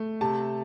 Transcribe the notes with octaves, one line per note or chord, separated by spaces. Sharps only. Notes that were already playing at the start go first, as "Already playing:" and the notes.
Already playing: A3
C3 A5